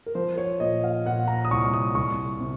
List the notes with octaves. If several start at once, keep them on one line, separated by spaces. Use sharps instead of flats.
A#4
F3 C5
C#5
A#2 D#5
F5
A#2 F#5
A#5
D#6
C2 C#6
D#6
C2 C#6
C3